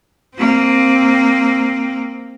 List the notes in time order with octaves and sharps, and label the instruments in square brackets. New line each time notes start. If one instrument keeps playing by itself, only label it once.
[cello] A#3 C4